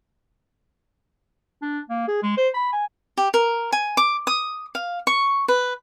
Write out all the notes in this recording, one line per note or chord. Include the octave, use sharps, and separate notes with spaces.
D4
A#3
G#4
G#3
C5
B5
G#5
G4
A#4
G#5
D6
D#6
F5
C#6
B4